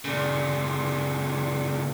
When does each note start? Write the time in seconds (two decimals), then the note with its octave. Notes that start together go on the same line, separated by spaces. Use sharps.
0.05 A#2 C#3